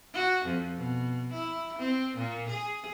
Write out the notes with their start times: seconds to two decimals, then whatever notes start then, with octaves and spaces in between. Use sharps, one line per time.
0.13 F#4
0.45 F2
0.77 B2
1.33 E4
1.79 C4
2.17 A#2
2.49 G#4